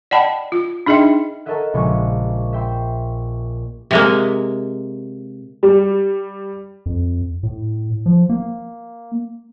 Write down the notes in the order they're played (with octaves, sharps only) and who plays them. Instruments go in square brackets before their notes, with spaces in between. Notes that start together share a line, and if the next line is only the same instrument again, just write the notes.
[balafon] D5 D#5 F#5 G5 A5 B5
F4
D4 D#4 G#4 D#5 E5 G5
[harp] A4 A#4 C#5 D#5 E5 F#5
A#1 C#3 G#3 C#6
E5 G5 C6
[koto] C3 G#3 A#3
[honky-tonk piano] G3
[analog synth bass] F2
A2
F3
A#3